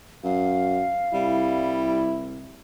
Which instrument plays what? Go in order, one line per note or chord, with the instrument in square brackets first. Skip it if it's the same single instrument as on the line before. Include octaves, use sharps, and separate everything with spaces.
[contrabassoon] F#2 [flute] F5
[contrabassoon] C2 [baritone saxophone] G3 [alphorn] E4